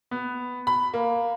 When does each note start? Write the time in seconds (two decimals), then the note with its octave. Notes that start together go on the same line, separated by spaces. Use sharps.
0.11 B3
0.67 B5
0.94 A#3